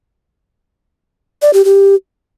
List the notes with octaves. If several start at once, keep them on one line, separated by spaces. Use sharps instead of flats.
D5
G4
G4